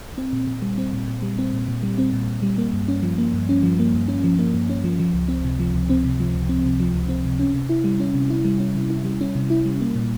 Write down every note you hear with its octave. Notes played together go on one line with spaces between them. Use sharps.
C4
A#2
A#2
G3
C4
A#2
A#2
G3
C4
A#2
A#2
G3
C4
A#2
A#2
G3
A#3
G2
C#4
F3
A#3
G2
C#4
F3
A#3
G2
C#4
F3
A#3
G2
C#4
F3
F3
C#2
C4
C3
F3
C#2
C4
C3
F3
C#2
C4
C3
F3
C#2
C4
C3
C#4
C3
E4
G3
C#4
C3
E4
G3
C#4
C3
E4
G3
C#4
C3
E4
G3
A#3
A#2